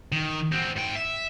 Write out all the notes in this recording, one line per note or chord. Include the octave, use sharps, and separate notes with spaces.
D#3
C4 F#4
G#2 G5
E5